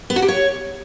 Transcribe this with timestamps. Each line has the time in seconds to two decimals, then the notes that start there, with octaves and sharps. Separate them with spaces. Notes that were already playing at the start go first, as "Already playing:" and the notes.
0.10 B3
0.16 F#4
0.22 G4
0.28 C#5